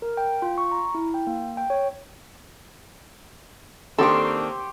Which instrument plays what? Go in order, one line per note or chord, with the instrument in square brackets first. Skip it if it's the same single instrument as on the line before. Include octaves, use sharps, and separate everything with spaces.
[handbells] A#4
G5
F4
C#6
A#5
E4
G5
A#3
G5
C#5
[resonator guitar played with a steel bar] D#3 D4 [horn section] A#3 C4 [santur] G4 C6 C#6 [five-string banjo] A4